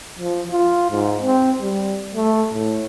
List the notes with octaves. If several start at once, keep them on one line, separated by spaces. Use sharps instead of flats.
F3
F4
G#2
C4
G3
A3
A2